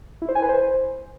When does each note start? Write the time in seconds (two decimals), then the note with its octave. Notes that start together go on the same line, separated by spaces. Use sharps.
0.22 E4
0.29 C5
0.35 G#5
0.42 B4
0.49 C5